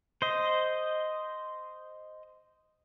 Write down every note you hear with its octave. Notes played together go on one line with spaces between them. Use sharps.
C5 D#5